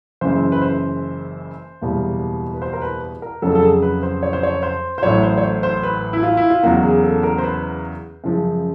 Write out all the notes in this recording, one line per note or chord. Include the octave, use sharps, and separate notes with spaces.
F#1 F#2 C#3 E3 C5
B4
C5
F#1 E2 B2 G3 A#3
B4
C5
A#4
B4
A#4
F2 C#3 F#3 A4
A4
G#4
B4
C5
C#5
C5
C#5
C5
C5
A1 A2 F#3 C#5
C5
C#5
C5
C5
B4
E4
F4
E4
F4
E2 C#3 F#3 A#3 F#4
G#4
A4
A#4
C5
B4
F#2 C#3 F3 G#3